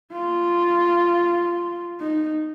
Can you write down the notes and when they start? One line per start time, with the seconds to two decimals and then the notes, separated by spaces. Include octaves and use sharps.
0.12 F4
2.00 D#4